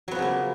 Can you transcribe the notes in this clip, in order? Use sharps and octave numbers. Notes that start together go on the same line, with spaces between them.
C#3 F3 F#3 A#3 B3